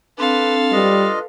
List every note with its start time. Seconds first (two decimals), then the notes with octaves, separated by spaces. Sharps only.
0.18 C4 D4 A4 B4 F5
0.72 G3 D4 F4 B4 D#5